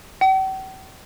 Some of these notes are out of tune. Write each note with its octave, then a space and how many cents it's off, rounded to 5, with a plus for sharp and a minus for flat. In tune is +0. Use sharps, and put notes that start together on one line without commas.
G5 -45